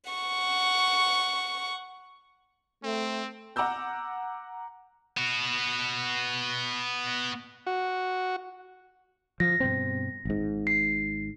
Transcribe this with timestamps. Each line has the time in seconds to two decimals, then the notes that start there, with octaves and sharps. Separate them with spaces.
0.11 F#5 C#6
2.84 A3 C4
3.56 F#5 A#5 D6 E6 G6
5.17 B3 F#4
7.67 F#4
9.40 F3 A#6
9.60 G2 B2 C4
10.25 G#1 G#2
10.67 C7